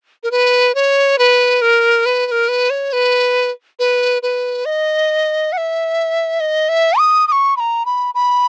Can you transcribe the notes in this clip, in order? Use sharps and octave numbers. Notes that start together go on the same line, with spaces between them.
A#4
B4
C#5
B4
A#4
B4
B4
A#4
B4
C#5
B4
B4
B4
D#5
F#5
E5
D#5
E5
D#6
D#6
C#6
B5
A#5
B5
B5